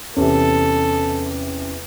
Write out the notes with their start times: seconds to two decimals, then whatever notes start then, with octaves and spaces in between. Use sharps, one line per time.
0.17 E2 C3 C#4 A4